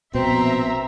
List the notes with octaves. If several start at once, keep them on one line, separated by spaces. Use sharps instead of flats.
A#1 B2 C4 E5 A#5